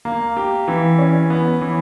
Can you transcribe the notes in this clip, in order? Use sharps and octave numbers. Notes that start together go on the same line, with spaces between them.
A#3
G4
E3
C#4
B3
E3